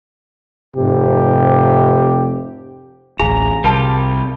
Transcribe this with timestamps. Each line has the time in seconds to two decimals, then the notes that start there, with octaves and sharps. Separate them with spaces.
0.76 F1 G#2 C3 G4
3.20 D1 A1 G#4 F5 G#5 A#5
3.64 C2 G3 F4 G4 A#4 A5